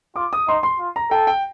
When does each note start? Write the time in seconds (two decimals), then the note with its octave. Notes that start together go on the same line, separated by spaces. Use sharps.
0.16 F4 D6
0.33 D#6
0.48 D#4 C6
0.63 C6
0.79 F4
0.96 A#5
1.11 A4 G5
1.27 G5